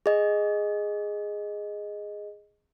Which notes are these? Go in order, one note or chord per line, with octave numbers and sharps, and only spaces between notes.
G#4 D#5